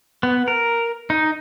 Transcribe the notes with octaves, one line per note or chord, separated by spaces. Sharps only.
B3
A#4
D#4